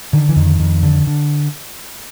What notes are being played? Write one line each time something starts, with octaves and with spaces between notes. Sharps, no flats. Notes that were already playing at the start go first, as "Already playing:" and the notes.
D3 D#3
E3
F2 D#3
F2
D3
D3